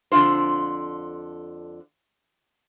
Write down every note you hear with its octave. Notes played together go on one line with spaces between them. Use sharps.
F2 D3 D4 F4 C5